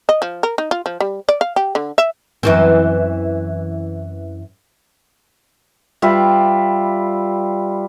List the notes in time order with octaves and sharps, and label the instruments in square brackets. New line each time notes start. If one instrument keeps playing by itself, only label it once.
[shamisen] D#5
F3
A#4
D#4
F4
F3
G3
D5
F5
G4
D3
E5
[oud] F#2 E3 C4
[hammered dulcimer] G3 F4 B4 E5